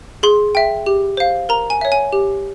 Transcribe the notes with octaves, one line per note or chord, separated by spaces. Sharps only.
G#4 C6
E5 G5
G4
C5 F5
A#4 A#5
G#5
C#5 E5
G#5
G4